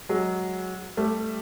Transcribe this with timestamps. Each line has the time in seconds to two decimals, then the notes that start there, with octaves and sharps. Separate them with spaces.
0.09 F#3 G#3
0.97 G3 A3